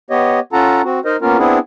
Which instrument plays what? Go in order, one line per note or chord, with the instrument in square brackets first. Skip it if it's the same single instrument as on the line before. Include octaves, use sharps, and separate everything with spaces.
[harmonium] B3 G4 C#5 D#5
C#4 F4 A4 F#5 A5 A#5
C4 F#4
D#4 A#4 C5 D#5
A#3 B3 C#4 F4 A#4
B3 C4 D4 E4 G#4